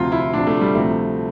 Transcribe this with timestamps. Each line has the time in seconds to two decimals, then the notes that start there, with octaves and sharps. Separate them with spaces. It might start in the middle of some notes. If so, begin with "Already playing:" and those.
Already playing: D2 C3 F3 F4
0.12 E4
0.33 D2 C3 F3 D4
0.47 A3
0.61 G3
0.75 D2 C3 F3 A3